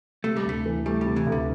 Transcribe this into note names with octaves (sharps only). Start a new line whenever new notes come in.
C3 A3
G3
D2 A3
E3
G3 A3
G3
C3
E3
D2
D3